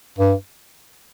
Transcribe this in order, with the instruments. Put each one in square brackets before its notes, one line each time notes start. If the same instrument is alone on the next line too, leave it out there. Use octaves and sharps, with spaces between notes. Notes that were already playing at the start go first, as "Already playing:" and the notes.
[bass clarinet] G2